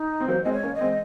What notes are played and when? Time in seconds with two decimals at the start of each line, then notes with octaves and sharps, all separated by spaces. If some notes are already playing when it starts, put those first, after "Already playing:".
Already playing: D#4
0.20 C4
0.28 F#3 A#3 C5
0.43 G#3 C4 D#5
0.52 C#5
0.63 A#3 C#4
0.74 D#5
0.81 G#3 C4